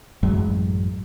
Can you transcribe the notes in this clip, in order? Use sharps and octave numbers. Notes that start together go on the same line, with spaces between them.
A1 F#2 F#3 G#3